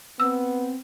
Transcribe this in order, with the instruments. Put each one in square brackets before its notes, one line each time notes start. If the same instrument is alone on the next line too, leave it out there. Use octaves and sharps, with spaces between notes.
[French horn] B3 [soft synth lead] C4 [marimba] E6